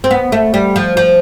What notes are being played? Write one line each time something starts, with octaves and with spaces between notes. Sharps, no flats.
C4
B3
A3
G3
F3
F3